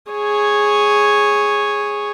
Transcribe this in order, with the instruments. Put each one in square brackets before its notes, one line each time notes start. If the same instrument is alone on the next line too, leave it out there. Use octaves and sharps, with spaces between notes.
[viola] G#4 C#5